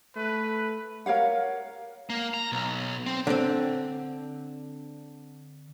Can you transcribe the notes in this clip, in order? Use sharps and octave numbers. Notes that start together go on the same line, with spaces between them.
A3 B4
A#4 C#5 F5 F#5
A#3
A#5
B1
C4
D3 C4